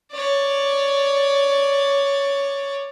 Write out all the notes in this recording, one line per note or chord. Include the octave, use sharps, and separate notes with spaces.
C#5 D5